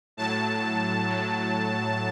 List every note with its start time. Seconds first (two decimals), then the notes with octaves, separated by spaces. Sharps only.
0.17 A2 F#3 A5
1.09 A2 F#3